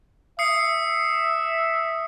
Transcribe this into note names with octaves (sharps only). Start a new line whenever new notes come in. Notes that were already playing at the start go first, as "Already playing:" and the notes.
E5 D#6 C7 C#7